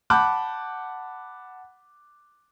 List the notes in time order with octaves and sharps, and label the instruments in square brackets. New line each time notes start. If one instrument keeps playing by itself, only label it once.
[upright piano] F#5 A5 B5 D6 F#6 G6